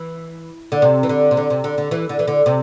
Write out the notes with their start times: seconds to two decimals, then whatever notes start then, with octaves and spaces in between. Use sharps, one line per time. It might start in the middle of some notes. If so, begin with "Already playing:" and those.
Already playing: E3
0.72 D3
0.82 C3
1.03 E3
1.09 D3
1.31 C3
1.37 D3
1.50 C3
1.64 D3
1.78 D3
1.91 E3
2.09 D3
2.19 E3
2.28 D3
2.46 C3